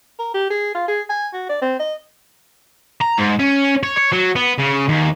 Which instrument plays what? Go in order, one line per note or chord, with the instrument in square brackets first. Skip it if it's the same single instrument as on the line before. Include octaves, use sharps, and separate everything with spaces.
[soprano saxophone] A#4
G4
G#4
F4
G#4
G#5
F#4
D5
C4
D#5
[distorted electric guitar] A#5
G#2
C#4
C#5
C#5
F#3
B3
C#3
D#2